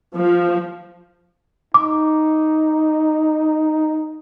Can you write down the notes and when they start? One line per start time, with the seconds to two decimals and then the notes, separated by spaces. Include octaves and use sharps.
0.14 F3
1.74 D#4 D6